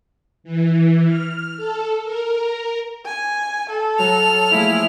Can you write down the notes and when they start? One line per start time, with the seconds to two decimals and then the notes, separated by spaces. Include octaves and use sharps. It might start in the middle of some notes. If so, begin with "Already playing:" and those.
0.44 E3
1.06 F6
1.57 A4
2.03 A#4
3.05 G#5
3.69 A4
3.99 F#3 C#5 A#5 F6
4.51 F3 A3 A#3 E4 G#4